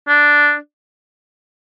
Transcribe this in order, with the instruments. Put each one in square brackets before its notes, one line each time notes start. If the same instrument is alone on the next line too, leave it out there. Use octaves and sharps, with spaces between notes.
[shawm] D4